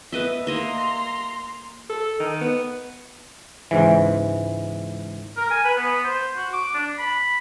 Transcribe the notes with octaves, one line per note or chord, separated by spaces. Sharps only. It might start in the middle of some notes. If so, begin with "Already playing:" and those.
B3 B4 D#5 E5
A#3 D#5 E5 A#5 C6
A4
D#3
B3
C#2 G#2 E3
A#4
G#5
B4
B3
C5
F#4
D6
D4
B5